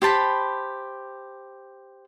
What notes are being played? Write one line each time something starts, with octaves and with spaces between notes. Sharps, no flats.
G4 C5 A5 B5